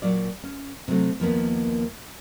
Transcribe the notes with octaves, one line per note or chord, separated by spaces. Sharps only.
A#2 F#3 F4 D5
C#4
C3 F#3 A3
D#2 F3 A#3 B3